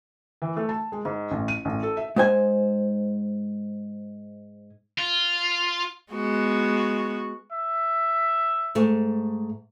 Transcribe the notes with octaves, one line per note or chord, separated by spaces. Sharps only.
E3
A3
A5
G#3
G#2
A1
D#7
A1
A4
E5
G#2 C5 G#5
F4
G#3 B3 F#4
E5
G#2 A3